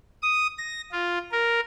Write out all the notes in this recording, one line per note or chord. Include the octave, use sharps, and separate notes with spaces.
D#6
A#6
F4
A#4